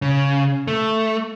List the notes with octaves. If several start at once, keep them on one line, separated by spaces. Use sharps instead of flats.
C#3
A3